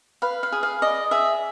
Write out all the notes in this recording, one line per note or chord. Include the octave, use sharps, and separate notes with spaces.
B4 F5
F5
G#4
F5
D5 D#5
G#4 E5